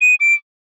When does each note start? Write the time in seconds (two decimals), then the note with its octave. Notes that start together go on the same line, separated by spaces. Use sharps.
0.01 D#7
0.20 D7